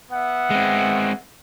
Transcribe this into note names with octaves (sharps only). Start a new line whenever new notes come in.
B3 E5 F#5
G#3 C4